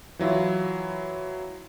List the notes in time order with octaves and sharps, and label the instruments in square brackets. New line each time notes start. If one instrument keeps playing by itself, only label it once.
[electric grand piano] E3 F#3 E4 F4